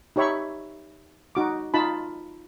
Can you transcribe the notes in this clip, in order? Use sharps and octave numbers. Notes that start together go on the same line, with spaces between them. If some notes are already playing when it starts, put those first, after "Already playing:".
D#4 G4 C#5 E5 B5 C#6
D#4 F#4 D6
D#4 F4 A5 B5